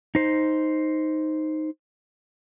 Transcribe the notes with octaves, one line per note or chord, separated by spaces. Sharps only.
D#4 C5